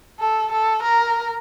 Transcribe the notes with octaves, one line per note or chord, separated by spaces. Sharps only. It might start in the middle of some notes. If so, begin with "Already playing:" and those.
A4
A4
A#4